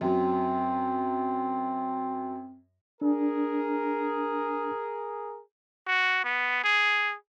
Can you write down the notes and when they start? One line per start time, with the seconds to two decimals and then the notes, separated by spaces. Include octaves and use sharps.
0.01 F#2 F#3 C4
3.01 D4 G#4 A#4
5.87 F#4
6.24 B3
6.64 G#4